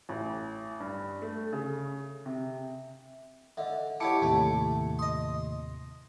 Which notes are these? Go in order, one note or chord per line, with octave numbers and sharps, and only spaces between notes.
A1
G2
A3
C#3
C3
D3 D#5 E5
E4 G4 C#5 F#5 A5 D6 C#7
D#2 A2 C3 A3 A5
D#5 C6 D#6